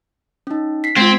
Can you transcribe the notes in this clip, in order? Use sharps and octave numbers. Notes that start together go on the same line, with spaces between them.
C#4 D#4
B6 C7
G#3 C4 F4 G#6